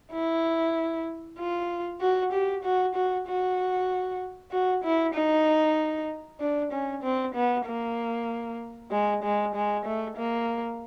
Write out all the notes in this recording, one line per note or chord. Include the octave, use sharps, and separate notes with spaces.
E4
F4
F#4
G4
F#4
F#4
F#4
F#4
E4
D#4
D4
C#4
C4
B3
A#3
G#3
G#3
G#3
A3
A#3